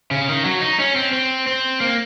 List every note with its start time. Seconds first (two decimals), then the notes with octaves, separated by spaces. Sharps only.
0.11 C#3
0.29 D#3
0.45 F#3
0.61 D#4
0.79 C#4
0.96 C4
1.13 C4
1.47 C4
1.80 A#3